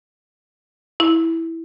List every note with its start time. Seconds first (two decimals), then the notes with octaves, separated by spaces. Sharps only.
1.00 E4